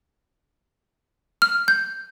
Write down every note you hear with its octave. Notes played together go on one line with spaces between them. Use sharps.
F6
G6